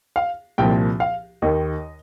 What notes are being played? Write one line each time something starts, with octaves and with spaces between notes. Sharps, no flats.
F5
C2 A#2 F3 G5
F5
D#2 D#3 D#5